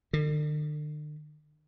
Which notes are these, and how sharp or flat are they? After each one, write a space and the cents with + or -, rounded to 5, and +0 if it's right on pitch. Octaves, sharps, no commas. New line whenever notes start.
D3 +45